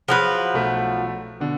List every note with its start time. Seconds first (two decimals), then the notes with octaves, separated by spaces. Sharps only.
0.08 F3 F#3 G#4 B4
0.54 B1 A3 E5
1.40 B2 D3